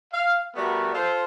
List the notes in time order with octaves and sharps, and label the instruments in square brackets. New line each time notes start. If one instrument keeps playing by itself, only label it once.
[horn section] F5
G3 A3 B3 F#4 A#4
F4 A4 C5